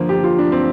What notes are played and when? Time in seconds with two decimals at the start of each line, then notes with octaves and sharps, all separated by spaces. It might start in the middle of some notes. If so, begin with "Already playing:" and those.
Already playing: D3 F3 A#3 C5
0.09 G4
0.24 F4
0.39 D4
0.52 C4